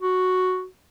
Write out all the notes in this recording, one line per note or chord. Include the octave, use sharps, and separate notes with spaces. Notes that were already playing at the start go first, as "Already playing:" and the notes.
F#4